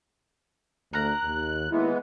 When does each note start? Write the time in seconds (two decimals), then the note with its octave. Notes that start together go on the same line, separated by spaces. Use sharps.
0.93 D2 A#4 A#5 F#6
1.24 D#2
1.71 D#2 E3 G#3 B3 E4